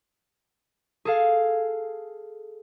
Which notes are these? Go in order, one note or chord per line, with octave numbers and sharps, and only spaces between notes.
G#4 A4 F5